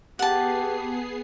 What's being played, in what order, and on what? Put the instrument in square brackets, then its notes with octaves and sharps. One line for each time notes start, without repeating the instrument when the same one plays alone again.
[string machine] B3 G#4 C7 [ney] G4 [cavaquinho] F#5 A5